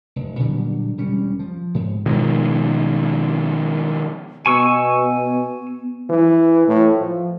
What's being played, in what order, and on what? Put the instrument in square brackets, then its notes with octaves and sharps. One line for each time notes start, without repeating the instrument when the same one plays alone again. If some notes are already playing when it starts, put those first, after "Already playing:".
[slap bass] F1
A#2 D3 F#3 G3
E1 G3 C#4
F3
G#2
[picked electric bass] B2 D#3 F3 G#3
[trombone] B2 [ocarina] B3 [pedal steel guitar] G#5 C#6 E6
[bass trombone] E3
A2
F3